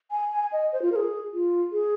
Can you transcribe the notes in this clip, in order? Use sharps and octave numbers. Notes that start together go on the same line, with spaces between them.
G#5
G#5
D#5
C5
F4
A#4
G#4
F4
G#4